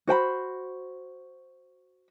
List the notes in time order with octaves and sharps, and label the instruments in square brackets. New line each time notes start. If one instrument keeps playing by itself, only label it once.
[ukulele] F#4 C5 G5 B5